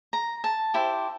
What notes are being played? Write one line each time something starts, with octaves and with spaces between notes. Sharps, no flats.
A#5
A5
E4 G4 C5